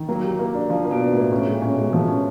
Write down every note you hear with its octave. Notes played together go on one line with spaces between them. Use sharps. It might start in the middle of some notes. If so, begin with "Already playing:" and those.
Already playing: D#3
F#3 A#3
G4
A#3
D4
F3 D4
A#3
B2
D4
A2 A#3
A2 C#4
G#3
A#2
C#4
B2
G#3
F3
C#4